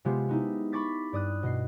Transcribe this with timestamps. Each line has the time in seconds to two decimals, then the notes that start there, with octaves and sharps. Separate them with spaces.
0.05 C3 G#3 B3 F4 G4
0.28 B3 D#4 E4
0.72 B5 C#6 D6 A6 B6
1.13 G2 D5 D#6 F#6
1.43 B2 D#5 C7